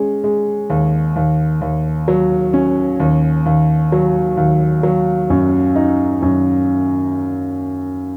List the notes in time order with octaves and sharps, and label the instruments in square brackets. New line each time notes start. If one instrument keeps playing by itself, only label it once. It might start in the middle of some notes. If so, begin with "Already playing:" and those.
Already playing: [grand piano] G#3 C#4
G#3
D#2
D#2
D#2
F#3
C#4
D#2
D#2
F#3
D#2
F#3
F#2
D#4
F#2